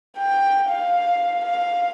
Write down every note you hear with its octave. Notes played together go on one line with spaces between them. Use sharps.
G5
F5
F5